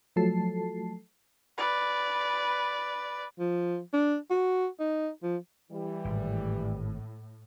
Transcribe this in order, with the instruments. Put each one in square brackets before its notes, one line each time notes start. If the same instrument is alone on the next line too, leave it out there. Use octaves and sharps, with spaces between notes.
[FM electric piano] F3 F#3 A3 A4 A5 C7
[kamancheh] B4 D5
[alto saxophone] F3
D4
F#4
D#4
F3
[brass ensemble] E3 G3
[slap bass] G#1 [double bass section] A2